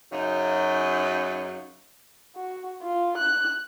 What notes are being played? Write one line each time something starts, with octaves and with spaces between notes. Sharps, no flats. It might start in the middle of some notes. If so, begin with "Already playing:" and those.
F#2 C#3 F#3 D#4
F#4
F4
F#6